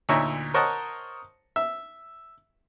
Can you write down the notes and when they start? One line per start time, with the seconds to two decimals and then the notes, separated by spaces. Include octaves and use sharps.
0.09 D2 A#2 D#4 C#5 E5 A#5
0.54 A#4 C5 C#5 D#5 F#5 A5
1.56 E5